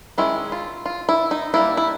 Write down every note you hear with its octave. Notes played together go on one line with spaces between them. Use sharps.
D#3 G#3 C#4 E4
F4
F4
E4
D#4
G3 A#3 D4 E4
E4